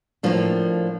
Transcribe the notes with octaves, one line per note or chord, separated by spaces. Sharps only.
A2 F3 A#3 D4